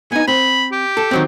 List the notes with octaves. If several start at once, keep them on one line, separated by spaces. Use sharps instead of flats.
B3 D#4 G#5
C4 B5
G4
A4
D#3 F#3 C4